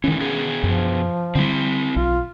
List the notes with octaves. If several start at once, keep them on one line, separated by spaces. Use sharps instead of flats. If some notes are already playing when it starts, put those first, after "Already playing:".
G#2 D#3 E3 C#4
B2 B3 G#4
F#2 F3
D3 G3 C4 E4
B1 F4